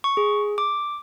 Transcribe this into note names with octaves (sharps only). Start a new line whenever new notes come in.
C#6
G#4
D6